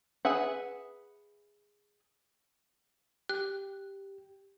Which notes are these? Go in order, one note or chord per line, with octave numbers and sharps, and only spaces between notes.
G#4 B4 E5 F#5
G4 F#6